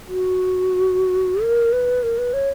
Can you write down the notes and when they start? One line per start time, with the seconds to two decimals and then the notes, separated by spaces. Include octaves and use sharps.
0.08 F#4
1.43 A#4
1.73 B4
2.03 A#4
2.18 B4
2.33 C#5